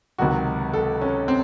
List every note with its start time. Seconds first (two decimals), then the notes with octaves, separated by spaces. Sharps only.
0.18 C#2 C3 D#3 F#3 F#4
0.74 A4
1.01 C#4
1.28 C4